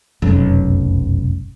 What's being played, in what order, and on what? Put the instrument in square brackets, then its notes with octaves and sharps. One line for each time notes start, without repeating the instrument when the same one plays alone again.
[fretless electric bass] F1 F#2 [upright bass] B1